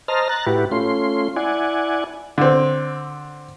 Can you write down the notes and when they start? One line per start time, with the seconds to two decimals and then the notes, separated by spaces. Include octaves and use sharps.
0.08 C5 D#5 A5 A#5 F6
0.29 A#5 F#6 A6
0.47 A2 E4 F#4 G4 B4
0.71 A3 C#4 F4 C6
1.36 E4 D5 F#5 G#5
2.38 D3 C4